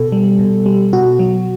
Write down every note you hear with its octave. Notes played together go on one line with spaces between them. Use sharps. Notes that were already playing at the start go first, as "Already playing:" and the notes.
Already playing: B2 A4
G3
B2
G3
B2 F#4
F#3